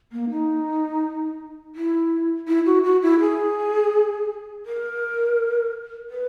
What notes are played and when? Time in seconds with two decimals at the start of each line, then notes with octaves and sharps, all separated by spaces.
0.12 A#3
0.30 D#4
1.75 E4
2.48 E4
2.66 F#4
2.84 F#4
3.02 E4
3.20 G#4
4.66 A#4
6.10 B4